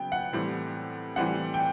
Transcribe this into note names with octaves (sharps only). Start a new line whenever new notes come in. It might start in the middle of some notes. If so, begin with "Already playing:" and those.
Already playing: C#3 F#3 B3 G5
F#5
A2 E3 G3 C4
A2 E3 G3 C4 F#5
G5